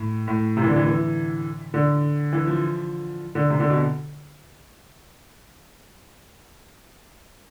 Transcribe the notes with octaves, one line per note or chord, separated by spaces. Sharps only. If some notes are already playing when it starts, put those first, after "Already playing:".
Already playing: A2
A2
C3
E3
D3
E3
E3
D3
E3
F3
D3
C3
D3
B2